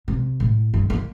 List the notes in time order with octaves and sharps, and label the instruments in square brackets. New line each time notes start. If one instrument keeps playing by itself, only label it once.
[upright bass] C3
A2
G2
G#3 A#3